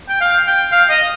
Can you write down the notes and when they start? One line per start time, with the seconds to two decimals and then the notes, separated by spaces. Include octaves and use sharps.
0.09 G5
0.21 F5
0.47 G5
0.72 F5
0.90 D#5